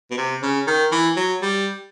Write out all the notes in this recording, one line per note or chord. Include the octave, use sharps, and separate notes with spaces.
B2
C3
C#3
D#3
E3
F#3
G3